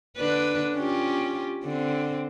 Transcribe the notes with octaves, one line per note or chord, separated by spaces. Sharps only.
D3 D4 B4
C#4 F4 G4
D3 C4